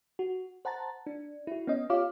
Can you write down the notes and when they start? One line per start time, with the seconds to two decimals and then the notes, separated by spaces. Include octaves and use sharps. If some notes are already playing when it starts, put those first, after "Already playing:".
0.19 F#4
0.65 C5 F#5 A5 A#5 A6
1.07 D4
1.47 E4 F#4
1.67 B3 C#4 D#5
1.90 F4 G4 C#5 F5 D6 F6